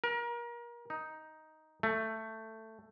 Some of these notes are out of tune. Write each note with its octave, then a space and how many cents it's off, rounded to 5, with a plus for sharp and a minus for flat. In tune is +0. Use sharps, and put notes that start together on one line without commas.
A#4 +30
D#4 +5
A3 +10